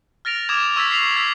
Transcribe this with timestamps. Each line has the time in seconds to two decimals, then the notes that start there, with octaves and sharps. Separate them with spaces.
0.25 F6 A6 A#6 D7 F7
0.49 D6 D#6 G#6 E7 F7
0.76 C#6 E6 G#6 A6 B6
0.91 B6 C7 F7 F#7
1.16 E6 G#6 B6 F7